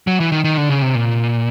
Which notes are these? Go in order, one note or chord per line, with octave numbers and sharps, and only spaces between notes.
F#3
E3
D#3
D#3
D3
C#3
C3
A#2